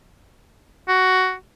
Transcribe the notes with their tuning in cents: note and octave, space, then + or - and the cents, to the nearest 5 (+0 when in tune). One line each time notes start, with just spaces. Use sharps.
F#4 +10